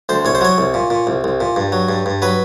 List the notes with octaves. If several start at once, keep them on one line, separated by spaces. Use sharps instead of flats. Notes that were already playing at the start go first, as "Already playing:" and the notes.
D2 C5
C2 C#5
C5
F#3 C#5
C2
A#2
A#2
C2
C2
A#2
G2
F#3
G2
G2
F#3 B4